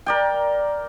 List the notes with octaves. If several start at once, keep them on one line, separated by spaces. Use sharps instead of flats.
A#4 D5 G5